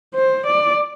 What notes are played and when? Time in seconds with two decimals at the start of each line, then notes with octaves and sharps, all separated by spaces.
0.15 C5
0.46 D5